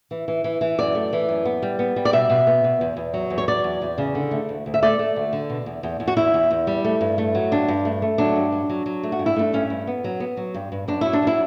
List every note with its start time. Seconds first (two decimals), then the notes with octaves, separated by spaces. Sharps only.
0.11 E3
0.28 E3
0.44 E3
0.61 E3
0.79 F#2 D5
0.95 A3
1.13 E3
1.29 F#2
1.45 B3
1.62 G3
1.79 B3
1.96 G3
2.05 D5
2.13 B2 E5
2.30 B2
2.47 B3
2.64 B2
2.81 E2
2.97 E2
3.14 F#3
3.30 E2
3.38 C#5
3.48 F#3 D5
3.64 E2
3.82 E2
3.98 C#3
4.15 D3
4.31 A3
4.49 D2
4.66 D2
4.74 E5
4.82 A3 D5
4.99 A3
5.16 D2
5.33 D3
5.50 B2
5.66 E2
5.83 E2
6.00 E2
6.08 F#4
6.17 E2 E4
6.34 E2
6.50 E2
6.67 G3
6.85 A3
7.01 G2
7.18 A3
7.35 F#3
7.51 G2 D4
7.68 G2
7.85 A3
8.02 A3
8.18 F#3 D4
8.36 G2
8.52 F#3
8.69 F#3
8.86 F#3
9.03 A3
9.12 F#4
9.19 G2
9.26 E4
9.36 A3 D4
9.53 G2 C#4
9.70 G2
9.87 B3
10.04 F#3
10.20 B3
10.37 F#3
10.54 G2
10.72 G2
10.88 F#2 D4
11.01 F#3 E4
11.13 D4
11.22 F#3 E4